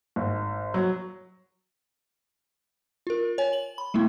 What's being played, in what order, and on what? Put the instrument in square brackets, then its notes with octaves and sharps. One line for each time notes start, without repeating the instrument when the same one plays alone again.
[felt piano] G#1
F#3
[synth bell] F4 A#4
C#5 G#5
F#7
B5
G#3 A3 B3 E4